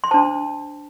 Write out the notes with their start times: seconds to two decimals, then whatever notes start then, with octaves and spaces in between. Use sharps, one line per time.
0.04 C6
0.11 D4 C5 A5